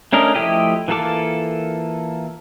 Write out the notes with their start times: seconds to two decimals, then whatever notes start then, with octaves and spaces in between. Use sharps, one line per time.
0.13 A3 C#4 D4 A#4 D#5
0.35 F3 A3 E4 G4 D#5
0.88 E3 A#3 F4 A4 D6